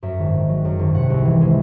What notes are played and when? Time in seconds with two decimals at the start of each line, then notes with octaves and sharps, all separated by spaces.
0.03 F#2 E5
0.19 G#1
0.34 D#3
0.49 F#3
0.65 F#2
0.79 G#1
0.95 C3 F#5
1.10 C2
1.25 E3
1.41 G#3